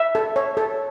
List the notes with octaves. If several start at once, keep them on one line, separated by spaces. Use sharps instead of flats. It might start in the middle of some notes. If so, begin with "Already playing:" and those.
Already playing: E5
A4
C#5
A4